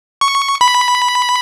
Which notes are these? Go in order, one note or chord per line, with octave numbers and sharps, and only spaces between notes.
C#6
B5